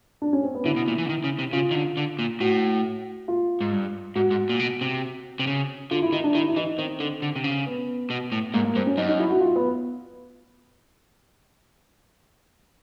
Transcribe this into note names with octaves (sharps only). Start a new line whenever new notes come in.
D4
C#4
C4
B3
D3 E4
B2
A#2
E3
D3
D#3
C#3
C3
C#3 F4
D#3
D3
D3
A#2
A2 F#4
F4
G#2
G2
G#2 F#4
G#2
A#2
B2
C3
C3
C#3
D3 F4
E4
D#3 D#4
D4
D#3 E4
E4
E3 D#4
D#3 C4
D3
D3
C3
C#3
B3
B2
A2
G#2 A#3
A#3
G2 C4
C#4
F#2 D#4
D#4
E4
F#4
F4
B3